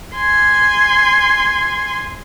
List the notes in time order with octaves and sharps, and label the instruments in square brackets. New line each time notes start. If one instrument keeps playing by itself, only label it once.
[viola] G#5 C6